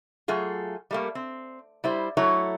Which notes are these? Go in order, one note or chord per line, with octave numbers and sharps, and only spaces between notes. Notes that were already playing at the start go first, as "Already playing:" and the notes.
F#3 A3 F4 G#4
G3 A3 A#3
C4
G3 E4 C5
F#3 A3 E4 C#5